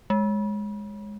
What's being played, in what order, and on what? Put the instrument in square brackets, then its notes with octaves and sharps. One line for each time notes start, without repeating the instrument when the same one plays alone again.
[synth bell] G#3